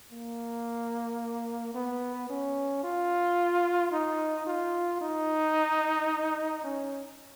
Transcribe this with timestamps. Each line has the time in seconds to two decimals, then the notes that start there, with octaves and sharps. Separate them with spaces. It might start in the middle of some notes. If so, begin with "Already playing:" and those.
0.12 A#3
1.75 B3
2.30 C#4
2.84 F4
3.92 D#4
4.47 F4
5.01 D#4
6.64 C#4